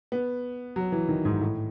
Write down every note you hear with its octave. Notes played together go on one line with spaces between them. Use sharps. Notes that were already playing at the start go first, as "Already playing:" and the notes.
B3
F#3
E3
D#3
G#2
A2